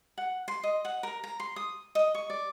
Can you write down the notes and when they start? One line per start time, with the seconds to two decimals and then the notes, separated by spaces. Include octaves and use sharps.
0.18 F#5
0.48 C6
0.63 D#5
0.85 F#5
1.03 A#4
1.24 A#5
1.40 C6
1.56 D#6
1.95 D#5
2.15 C#6
2.30 D5